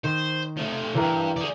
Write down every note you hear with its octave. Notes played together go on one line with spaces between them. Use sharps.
D#3 C5
F3 A3
D2 G2 E3 A#4
G#4 D5